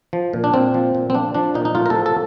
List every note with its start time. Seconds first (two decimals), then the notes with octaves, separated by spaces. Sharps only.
0.13 F3
0.33 A#2
0.44 D4
0.54 A#2 C4
0.74 F3
0.95 A#2
1.10 C4
1.14 F3 D4
1.35 F3 D4
1.54 A#2 D#4
1.65 D#4
1.75 A2 F4
1.86 A#4
1.90 A4
1.96 F3
2.06 A4